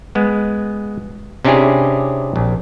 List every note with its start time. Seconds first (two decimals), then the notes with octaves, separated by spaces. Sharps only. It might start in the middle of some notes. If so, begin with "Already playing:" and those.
0.15 G#3 B3
1.45 C3 C#4 D4 E4 G4 G#4
2.36 A#1